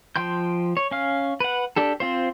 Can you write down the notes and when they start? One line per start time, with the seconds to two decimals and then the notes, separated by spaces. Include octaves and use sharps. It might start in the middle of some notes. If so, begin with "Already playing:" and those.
0.16 F3 G5 C6 G6
0.77 C#5
0.91 C#4 F5
1.40 B4 F#5
1.76 D4 G4 A4
2.00 C4 F4 C5